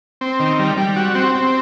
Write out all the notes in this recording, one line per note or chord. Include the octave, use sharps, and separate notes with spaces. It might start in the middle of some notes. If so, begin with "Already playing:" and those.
C4
D#3
G3
G3
F#4
C4
C4